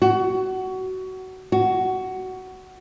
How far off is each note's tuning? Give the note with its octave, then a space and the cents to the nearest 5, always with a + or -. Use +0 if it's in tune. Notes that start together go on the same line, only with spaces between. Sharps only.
F#4 +20
F#4 +15